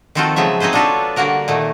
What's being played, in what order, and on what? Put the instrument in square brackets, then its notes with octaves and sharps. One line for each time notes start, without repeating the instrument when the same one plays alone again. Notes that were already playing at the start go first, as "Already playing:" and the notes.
[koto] D#3 F3 C4 F4 F#4 A4
C#3 F3 F#3 G#3 E5
C4 D#4 G#4 B4 C5
D4 F4 F#4 A4 B4 C#5
D3 G3 A#3 F#4 A#4
A#2 D#3 A3